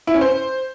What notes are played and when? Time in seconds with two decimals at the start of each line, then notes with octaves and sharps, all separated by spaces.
0.07 E4
0.14 C#4
0.21 C5